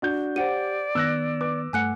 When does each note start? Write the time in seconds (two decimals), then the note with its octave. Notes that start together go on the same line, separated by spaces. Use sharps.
0.02 D4 F#4 G6
0.36 G4 C5 D5 F#5 D#7
0.95 D#3 B3 E6 F#6 A#6
1.41 B4 D6
1.73 G2 A3 F#5 G#5 F#6 C#7